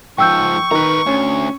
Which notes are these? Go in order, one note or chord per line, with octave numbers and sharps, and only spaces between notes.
G#2 F3 G5 C#6 E6 G6
D#3 B4 A#5
D2 C#4